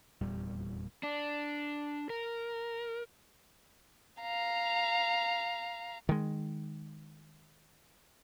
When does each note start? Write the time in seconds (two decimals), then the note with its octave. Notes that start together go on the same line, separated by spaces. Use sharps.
0.21 F1 E2 A#2 G3
1.03 D4
2.10 A#4
4.22 F5 A#5
6.09 D#3 G#3